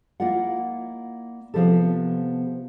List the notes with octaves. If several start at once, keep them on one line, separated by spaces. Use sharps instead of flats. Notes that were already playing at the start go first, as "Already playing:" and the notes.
A#3 E4 F4 D5 F#5
C3 E3 F3 B3 G4 A4